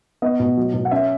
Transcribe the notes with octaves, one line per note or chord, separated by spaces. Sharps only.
B3 D#5
B2
F#3
B2
F#5
C#4 E5